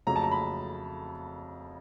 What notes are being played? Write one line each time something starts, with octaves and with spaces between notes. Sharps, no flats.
F2 C#3 F#3 A3 A#5
A5
A#5
B5